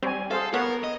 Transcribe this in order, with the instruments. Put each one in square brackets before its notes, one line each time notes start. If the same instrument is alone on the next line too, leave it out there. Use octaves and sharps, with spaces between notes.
[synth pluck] G3 C4 [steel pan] C#5 G#5
[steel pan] G#4 C5 F5 [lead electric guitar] A4
[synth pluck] B3 [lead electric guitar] A#4 [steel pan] C#5
[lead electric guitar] D#5